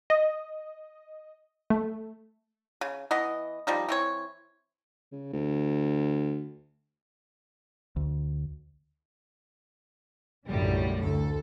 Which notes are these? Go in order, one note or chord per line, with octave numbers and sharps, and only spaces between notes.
D#5
A3
C#3
E3 B3 D#5
F3 G3 D#4
E3 C4 C#5
C#3
D2
D2
B1 F#2 A2 D3 G3
D2 A4